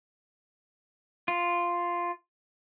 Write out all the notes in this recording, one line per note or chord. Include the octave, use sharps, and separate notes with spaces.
F4